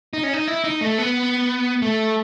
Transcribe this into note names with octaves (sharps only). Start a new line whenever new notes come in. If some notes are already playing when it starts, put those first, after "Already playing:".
D#4
C#4
D#4
E4
D#4
A3
B3
A3